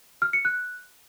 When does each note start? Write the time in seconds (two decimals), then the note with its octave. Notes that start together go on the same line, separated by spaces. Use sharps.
0.22 F6
0.33 C#7
0.45 F#6